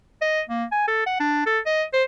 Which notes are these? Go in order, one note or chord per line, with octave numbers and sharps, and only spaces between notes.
D#5
A#3
G#5
A4
F#5
D4
A4
D#5
C5